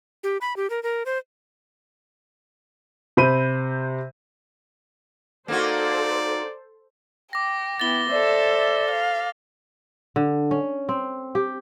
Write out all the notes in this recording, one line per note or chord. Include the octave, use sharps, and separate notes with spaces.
G4
B5
G4
A#4
A#4
C5
C3 C5 B5 D#7
A#3 D#4 F#4 A4 C5 D5
G5 D6 A#6
B3 E4 A6 G7
A4 C5 D5 E5
F5
D3
C#4
C4
G4